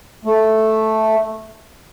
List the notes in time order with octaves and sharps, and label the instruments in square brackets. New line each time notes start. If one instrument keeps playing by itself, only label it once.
[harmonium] A3